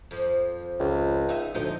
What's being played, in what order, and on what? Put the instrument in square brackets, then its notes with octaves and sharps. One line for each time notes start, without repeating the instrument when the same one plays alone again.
[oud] F2 F3
[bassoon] C#2
[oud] D#4 E5
[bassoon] D2 [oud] A#2 F3 D#4